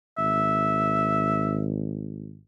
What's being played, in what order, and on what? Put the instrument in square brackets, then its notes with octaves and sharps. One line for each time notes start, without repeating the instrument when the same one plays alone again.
[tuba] G#1 [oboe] E5